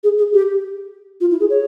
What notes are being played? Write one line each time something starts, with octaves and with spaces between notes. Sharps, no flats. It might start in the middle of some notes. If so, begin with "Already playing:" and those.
G#4
G#4
G4
F4
E4
G#4
C#5